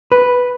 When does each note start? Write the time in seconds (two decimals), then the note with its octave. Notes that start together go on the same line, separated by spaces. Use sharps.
0.12 B4